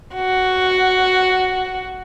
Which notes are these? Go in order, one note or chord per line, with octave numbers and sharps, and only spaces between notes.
F#4